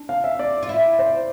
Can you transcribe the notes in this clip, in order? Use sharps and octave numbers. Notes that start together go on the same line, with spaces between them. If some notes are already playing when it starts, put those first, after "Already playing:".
Already playing: D4
F5
E5
D5
F4
E4
C5